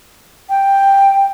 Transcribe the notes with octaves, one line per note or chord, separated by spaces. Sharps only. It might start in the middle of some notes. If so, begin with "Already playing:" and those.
G5